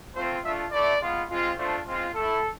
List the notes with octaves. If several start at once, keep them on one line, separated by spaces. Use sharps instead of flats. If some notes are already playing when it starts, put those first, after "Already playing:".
A3 C4 F4 C5
A3 D4 F4 E5
A3 E4 D5
G#3 B3 F4
G#3 C4 F4
A3 D4 F4 C5
G#3 C4 F4
A3 E4 A4